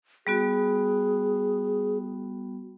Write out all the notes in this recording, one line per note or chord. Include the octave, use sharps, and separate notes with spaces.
G3 B3 F#4 G#4